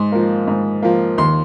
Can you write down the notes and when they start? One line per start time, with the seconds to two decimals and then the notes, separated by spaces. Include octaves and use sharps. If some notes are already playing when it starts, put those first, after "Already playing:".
Already playing: G#2 C6
0.12 F3 A#3
0.47 G#2
0.82 F3 A#3
1.18 D#2 C6